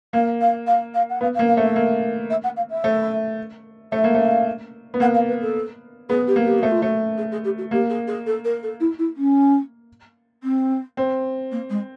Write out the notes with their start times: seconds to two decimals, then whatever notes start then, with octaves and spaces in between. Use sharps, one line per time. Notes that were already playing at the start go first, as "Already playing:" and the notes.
0.13 A#3 F5
0.41 F5
0.66 F5
0.94 F5
1.09 F#5
1.21 B3 F5
1.34 F5
1.39 A#3
1.48 F5
1.57 A3
1.63 E5
1.76 A#3
2.30 E5
2.44 F#5
2.56 F5
2.70 E5
2.84 A3
3.92 A3 E5
4.04 A#3
4.15 A3
4.20 F5
4.94 B3
5.00 A#3 F#5
5.14 F5
5.28 B4
5.41 A4
6.09 B3 G#4
6.27 G4
6.36 A#3
6.45 G4
6.58 A3 F#4
6.70 F4
6.82 A3 F#4
7.17 G#4
7.31 G#4
7.44 G4
7.58 F#4
7.71 A#3 G4
7.89 G#4
8.07 G#4
8.26 A4
8.44 A#4
8.62 A4
8.80 E4
8.98 E4
9.16 C#4
10.43 C4
10.97 C4
11.51 A#3
11.69 G#3